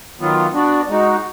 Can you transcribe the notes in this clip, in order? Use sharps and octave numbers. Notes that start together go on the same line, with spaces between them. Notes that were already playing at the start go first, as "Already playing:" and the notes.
D#3 F#3 B3 F4
B3 D4 F#4 D5
G#3 D#4 F#4